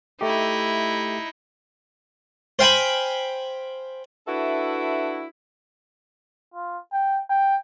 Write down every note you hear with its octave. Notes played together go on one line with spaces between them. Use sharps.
A3 D#4 E4 G4
C5 F5 G5 G#5 B5
D4 E4 F#4 A4 B4 E5
F4
G5
G5